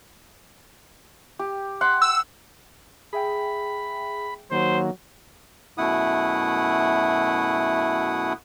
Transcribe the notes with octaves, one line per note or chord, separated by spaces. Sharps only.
G4
F#5 C6
E6
G#4 E5 G5 B5
D#3 F#3 A#3 C5
F#2 B2 A3 E4 F#5 D#6